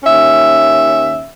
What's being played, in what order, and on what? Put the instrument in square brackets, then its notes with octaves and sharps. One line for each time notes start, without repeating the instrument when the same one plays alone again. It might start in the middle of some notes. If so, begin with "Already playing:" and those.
[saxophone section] D#2 C#4 E5